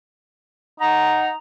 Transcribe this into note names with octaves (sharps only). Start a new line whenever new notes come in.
D#4 F#5 A#5